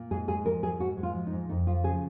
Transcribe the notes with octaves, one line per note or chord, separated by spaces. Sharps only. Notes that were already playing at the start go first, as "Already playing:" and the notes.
Already playing: A#2
G#2 G#4
G#3 G#4
F3 A#4
G#2 G#4
G#2 F#4
G#3
F4
F3
D#4
G#2
F2 D#4
F3 F4
C#3 G#4